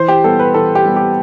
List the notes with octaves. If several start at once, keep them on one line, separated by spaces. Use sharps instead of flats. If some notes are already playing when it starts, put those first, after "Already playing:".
Already playing: E3 C5
G4
G3 B3 A4
B4
E3 A4
G4
G3 B3
G4